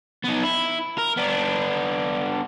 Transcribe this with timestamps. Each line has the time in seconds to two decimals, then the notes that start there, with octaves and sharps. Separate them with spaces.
0.24 B3 D#4
0.43 E4
0.98 A#4
1.17 B3 D4